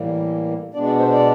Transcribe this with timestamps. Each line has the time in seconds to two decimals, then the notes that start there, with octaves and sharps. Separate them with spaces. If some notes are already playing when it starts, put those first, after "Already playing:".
Already playing: A2 E3 G3 A#3
0.74 B2 G#3 B3 D4 D5
0.87 D5
0.99 C5
1.12 D5